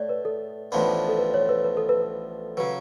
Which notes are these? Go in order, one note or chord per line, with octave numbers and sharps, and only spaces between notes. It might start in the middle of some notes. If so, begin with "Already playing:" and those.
Already playing: A2 C#5 D5
B4
A4
A1 A2 F3 B3 D4
A4
B4
C#5
B4
B4
A4
B4
C#3 F#3 B4